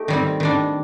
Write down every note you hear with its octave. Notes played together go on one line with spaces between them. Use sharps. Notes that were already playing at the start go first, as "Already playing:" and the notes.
Already playing: A3 D#4 G4
D#3 G3 C4
D#3 G3 D4